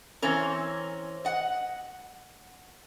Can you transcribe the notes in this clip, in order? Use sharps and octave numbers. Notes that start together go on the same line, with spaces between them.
E3 C4 C#4 A#4
D#5 F#5